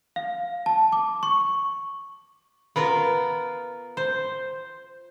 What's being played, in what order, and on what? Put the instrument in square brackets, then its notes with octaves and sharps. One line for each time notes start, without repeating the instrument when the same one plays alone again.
[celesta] F5
A5
D6
C#6
[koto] B3 F4 A#4
C5